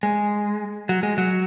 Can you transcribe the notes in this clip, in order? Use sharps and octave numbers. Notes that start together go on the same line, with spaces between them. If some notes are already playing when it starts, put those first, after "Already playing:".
G#3
F#3
G#3
F#3